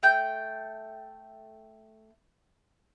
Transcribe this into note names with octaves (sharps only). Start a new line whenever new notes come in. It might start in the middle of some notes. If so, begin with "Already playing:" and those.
A3 G5 G6